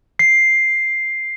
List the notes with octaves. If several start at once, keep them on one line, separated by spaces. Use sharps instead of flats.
C7